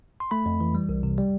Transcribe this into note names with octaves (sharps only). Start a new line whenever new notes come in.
C6
A3 B5
F2
E3
G3
C2
C3
G3